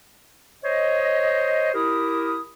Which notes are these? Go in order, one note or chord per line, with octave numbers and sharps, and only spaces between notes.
C5 C#5 D#5
E4 G4 A#4 D#6